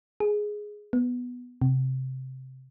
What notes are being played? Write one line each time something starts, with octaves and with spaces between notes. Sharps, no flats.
G#4
B3
C3